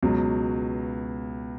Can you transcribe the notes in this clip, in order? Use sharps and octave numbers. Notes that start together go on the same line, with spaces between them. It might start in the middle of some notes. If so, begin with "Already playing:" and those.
C#2 B2 F#3